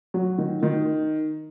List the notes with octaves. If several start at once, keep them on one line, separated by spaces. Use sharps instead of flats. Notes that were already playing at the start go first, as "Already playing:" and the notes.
F#3
D#3
D#3